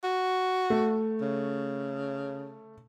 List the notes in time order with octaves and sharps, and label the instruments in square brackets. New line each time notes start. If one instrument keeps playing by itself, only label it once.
[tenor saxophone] F#4
[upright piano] A3
[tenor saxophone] C#3